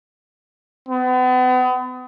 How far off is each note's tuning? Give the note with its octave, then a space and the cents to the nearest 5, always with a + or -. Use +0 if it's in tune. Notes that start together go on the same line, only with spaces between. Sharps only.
B3 +40